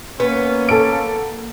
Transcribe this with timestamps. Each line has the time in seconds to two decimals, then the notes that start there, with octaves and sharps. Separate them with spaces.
0.20 A#3 B3 C#4
0.69 A4 D7